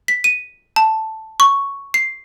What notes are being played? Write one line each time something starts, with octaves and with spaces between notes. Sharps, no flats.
B6
D#7
A5
C#6
C7